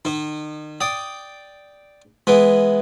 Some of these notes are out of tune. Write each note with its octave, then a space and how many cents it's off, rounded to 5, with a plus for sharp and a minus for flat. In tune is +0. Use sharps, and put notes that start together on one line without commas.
D#3 -40 D#4 -35
D5 +0 G5 +0 D#6 +0
E3 +0 G#3 +0 B3 +0